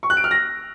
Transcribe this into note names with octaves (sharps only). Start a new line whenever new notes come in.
C#6
F#6
D7
F6
A#6